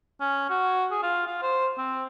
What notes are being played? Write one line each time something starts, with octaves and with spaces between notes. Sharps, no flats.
C#4
F#4
G#4
F4
F4
C5
C4